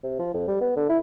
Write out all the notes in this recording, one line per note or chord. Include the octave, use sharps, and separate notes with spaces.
C3
F3
F2
G3
B3
D3
E4